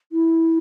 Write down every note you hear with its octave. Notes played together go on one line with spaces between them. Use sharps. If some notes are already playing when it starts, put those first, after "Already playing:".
E4